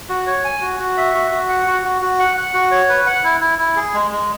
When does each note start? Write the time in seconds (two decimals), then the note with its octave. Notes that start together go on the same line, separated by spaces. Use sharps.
0.09 F#4
0.27 C#5
0.45 G#5
0.61 F#4
0.79 F#4
0.97 E5
1.15 F#4
1.31 F#4
1.49 F#5
1.67 F#4
1.85 F#4
2.02 F#4
2.19 F#5
2.37 F#5
2.54 F#4
2.72 C#5
2.89 B4
3.07 F#5
3.24 E4
3.41 E4
3.59 E4
3.76 G#4
3.94 G#3
4.11 G#3